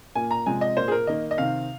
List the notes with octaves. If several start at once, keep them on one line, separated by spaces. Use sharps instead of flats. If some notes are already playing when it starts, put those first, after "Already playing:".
A#2 A#3 G#5
A#5
C3 F3 G#3 C4 G#5
D#5
A#2 A#3 C5
G#4
A#4
D#3 A#3 D#5
D#5
C3 D#3 C4 F5